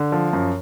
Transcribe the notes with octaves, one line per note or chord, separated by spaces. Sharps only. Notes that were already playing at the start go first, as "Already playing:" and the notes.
Already playing: D3
F3
F#2